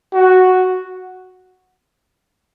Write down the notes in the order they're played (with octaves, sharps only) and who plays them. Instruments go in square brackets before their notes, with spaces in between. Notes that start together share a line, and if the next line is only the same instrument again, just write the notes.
[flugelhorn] F#4